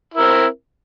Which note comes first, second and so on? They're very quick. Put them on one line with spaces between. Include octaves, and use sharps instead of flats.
E4 A#4 C4